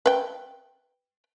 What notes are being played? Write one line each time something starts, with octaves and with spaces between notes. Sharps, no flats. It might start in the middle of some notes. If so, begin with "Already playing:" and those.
B4 G5